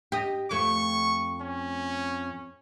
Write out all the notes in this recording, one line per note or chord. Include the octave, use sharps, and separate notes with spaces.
G4 D#5
F2 A3 C#6
C#4